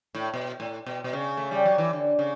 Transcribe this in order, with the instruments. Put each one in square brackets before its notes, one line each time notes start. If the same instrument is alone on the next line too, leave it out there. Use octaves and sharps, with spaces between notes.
[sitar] A2
B2
A2
B2
B2
C#3
A3
G3
F#3
E3
D3
C#3